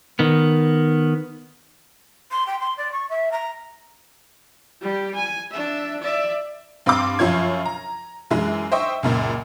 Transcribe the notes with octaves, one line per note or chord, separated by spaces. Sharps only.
D#3 B3
C6
G5
C6
D5
C#6
E5
A#5
G3 G4
G#5
D4 E5
D5 E5
G2 C4 F5 B5 C6 D6
F#2 F3 F4 C#5 G#6
A#5
F#2 E3 G#3
C5 D#5 E5 G5 C#6
C#2 F#2 A#2